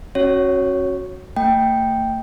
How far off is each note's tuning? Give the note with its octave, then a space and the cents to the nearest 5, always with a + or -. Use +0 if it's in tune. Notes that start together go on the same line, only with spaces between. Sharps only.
C#4 -35 F#4 -5 C#5 +0
A3 +45 G5 +0